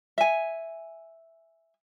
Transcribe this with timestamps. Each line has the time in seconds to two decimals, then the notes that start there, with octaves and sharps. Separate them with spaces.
0.18 E5 G#5